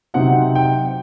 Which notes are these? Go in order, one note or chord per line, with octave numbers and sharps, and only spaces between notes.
C3 F#3 C4 D#4 F#5
G5